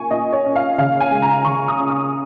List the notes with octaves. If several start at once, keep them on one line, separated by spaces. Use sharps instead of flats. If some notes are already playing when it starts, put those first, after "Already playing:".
Already playing: A#2 A#3 G#5 C#6
A#2 D#5
C#5
C#4
F5
C#3 F5
G#5
G#3
A#5
C#3 C#6
D#6
C#4
D#6